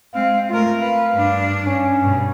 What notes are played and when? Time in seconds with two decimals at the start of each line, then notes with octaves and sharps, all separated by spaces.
0.14 G#3 C4 F5
0.49 A3 F4 A#4
0.81 B4 F5
1.13 G2 D4
1.67 C#4
2.01 G2 B2